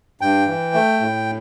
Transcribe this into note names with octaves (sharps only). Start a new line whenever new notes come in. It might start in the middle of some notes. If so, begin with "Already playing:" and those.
G2 G5
E3
A3
A2